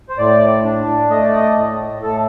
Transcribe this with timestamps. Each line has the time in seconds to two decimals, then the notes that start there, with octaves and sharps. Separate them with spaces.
0.09 C5
0.18 A2 D5
0.64 D4
1.10 A3 D#5
1.23 D5
1.36 D#5
1.56 A2
2.03 A2 A4